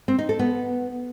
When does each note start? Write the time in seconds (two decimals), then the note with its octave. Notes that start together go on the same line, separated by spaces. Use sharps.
0.08 C4
0.19 D#4
0.29 A4
0.39 B3